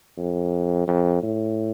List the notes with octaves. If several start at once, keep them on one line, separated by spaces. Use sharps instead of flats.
F2
F2
A2